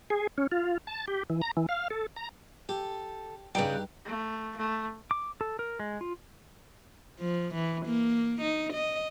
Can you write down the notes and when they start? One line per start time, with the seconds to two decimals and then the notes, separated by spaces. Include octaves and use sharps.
0.10 G#4
0.38 C#4
0.52 F4
0.87 A5
1.08 G4
1.30 E3
1.42 A#5
1.57 E3
1.69 F5
1.90 A4
2.16 A#5
2.69 G4 A4
3.55 G2 C#3 G3 D#4 G4 G5 F#6
4.05 A3
4.57 A3
5.11 D6
5.41 A4
5.59 A#4
5.80 G#3
6.01 F4
7.19 F3
7.54 E3
7.86 A#3
8.41 D#4
8.73 D#5